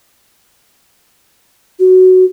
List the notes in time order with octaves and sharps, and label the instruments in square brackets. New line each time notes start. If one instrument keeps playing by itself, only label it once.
[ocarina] F#4